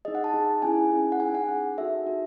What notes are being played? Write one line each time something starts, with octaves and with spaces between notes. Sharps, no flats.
D#4 G#4 D#5
F#5
A5
D#4 G#4
C#4 E4 G#4 G#5
C#4 E4 G#4
F#5
D#4 G#4 G#5
F#5
D#4 G#4
D#4 F#4 A4 E5
D#4 F#4 A4